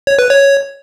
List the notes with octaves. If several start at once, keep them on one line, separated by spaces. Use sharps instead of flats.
C#5
B4
C#5